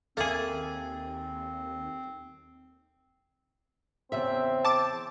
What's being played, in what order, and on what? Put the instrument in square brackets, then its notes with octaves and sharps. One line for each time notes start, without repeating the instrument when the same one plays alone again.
[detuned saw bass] D#2 [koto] A#3 G#4 [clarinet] C4 [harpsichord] A4 E5 A5
[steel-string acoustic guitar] E2 C#3 E5 [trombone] C4
[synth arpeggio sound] A5 D6 A6